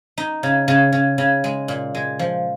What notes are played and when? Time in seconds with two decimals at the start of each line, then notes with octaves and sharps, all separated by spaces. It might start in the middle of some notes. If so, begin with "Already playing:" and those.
0.18 D#4
0.43 C#3
0.68 C#3
0.92 C#3
1.18 C#3
1.44 G#3
1.68 A#2
1.95 G#3
2.19 F3